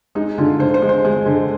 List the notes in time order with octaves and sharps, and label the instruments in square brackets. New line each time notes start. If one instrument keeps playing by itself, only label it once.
[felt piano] G#3 D#4
D3 F4
D3 C5
C5
G#3
C5
G#3
D3